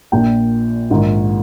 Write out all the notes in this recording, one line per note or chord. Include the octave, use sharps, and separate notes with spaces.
A#1 A#2 G5
A#1 G#2 D#3